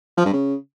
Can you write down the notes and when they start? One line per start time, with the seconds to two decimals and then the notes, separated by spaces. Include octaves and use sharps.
0.18 F3
0.25 G2
0.33 C#3